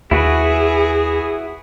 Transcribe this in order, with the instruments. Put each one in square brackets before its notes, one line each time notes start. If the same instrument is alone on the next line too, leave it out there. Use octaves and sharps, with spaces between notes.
[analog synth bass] D#2 [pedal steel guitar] E4 F#4 B4 [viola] G#4